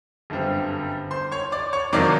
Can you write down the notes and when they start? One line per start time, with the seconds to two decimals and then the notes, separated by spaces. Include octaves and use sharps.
0.30 G1 F#2 D3 G3 C4
1.11 C5 C6
1.32 C#5 C#6
1.52 D5 D6
1.73 C#5 C#6
1.93 F2 C3 D#3 F#3 A#3 D5 D6